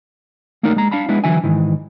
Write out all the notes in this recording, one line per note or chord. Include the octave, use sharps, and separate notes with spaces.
A3 A#3 D4 D#4 A#4
G#3 A#5
D4 F5 A5 B5
G#3 B3 D4 E4
D3 E3 F#3 E5 G#5
G#2 D#3 E3